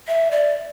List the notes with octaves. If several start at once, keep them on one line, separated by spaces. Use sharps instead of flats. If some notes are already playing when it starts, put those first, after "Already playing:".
E5
D5